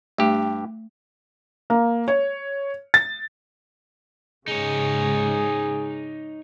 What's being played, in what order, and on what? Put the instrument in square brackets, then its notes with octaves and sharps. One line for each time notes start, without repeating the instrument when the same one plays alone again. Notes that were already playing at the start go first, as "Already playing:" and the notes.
[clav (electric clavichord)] G2 G4 [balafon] A3
[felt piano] A#3
C#5
A6
[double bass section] G#2 C#3 [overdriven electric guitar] D#4 C#5 [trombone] G#4